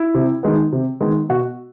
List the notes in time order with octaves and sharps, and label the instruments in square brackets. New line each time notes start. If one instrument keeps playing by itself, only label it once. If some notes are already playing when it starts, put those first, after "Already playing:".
Already playing: [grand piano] E4
C3
D#3 G#3 B3
C3
D#3 G#3 B3
B2 F#4